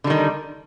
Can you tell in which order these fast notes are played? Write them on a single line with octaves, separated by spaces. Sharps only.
D3 G3 D#3